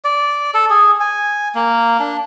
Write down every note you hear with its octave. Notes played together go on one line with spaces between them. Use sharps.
D5
A4
G#4
G#5
A#3
D4